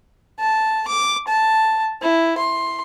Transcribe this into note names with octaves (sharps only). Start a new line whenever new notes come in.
A5
D6
A5
E4
C6